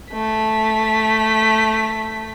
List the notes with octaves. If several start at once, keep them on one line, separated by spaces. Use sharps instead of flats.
A3 B6